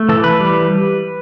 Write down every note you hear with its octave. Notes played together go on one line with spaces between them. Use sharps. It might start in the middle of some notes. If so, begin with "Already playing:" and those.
Already playing: A3
E3 A4
B4
G3